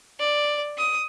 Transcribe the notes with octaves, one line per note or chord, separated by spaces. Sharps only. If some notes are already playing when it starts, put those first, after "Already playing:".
D5
D#6